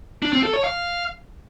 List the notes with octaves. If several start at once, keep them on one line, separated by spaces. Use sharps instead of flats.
D4
C4
A4
C#5
F5